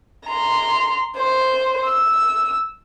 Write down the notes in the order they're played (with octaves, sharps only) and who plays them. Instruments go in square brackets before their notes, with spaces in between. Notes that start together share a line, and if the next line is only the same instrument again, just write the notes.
[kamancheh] A#5 C6
C5
E6